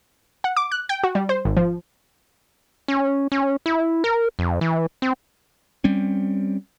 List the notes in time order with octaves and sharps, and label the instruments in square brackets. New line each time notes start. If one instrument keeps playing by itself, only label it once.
[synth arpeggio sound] F#5
D6
F#6
G5
F#4
G3
C5
G#1
F3
[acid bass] C#4
C#4
E4
A#4
F2
E3
C4
[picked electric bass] G3 C4 C#4